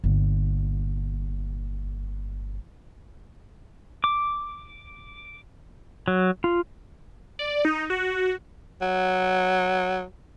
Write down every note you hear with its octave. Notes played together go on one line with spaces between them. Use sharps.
G1 A#2
D6
F#3
F4
D5
D#4
F#4
F#3